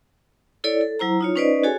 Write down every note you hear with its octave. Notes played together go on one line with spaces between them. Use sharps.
E4 A4 C#5 D5
A4
F#3 E4 C5 A#5
D#4 F4 C#5
C#4 D#4 B4 C5 D5 D#5
F#4 G#4 A4 C#5 G#5